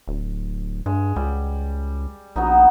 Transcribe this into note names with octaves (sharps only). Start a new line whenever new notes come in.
D1
G2 G#3
C#2 G3
A#1 F#3 B3 D#4